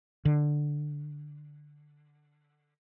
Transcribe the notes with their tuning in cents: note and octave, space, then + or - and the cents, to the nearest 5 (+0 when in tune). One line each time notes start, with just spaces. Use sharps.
D3 +10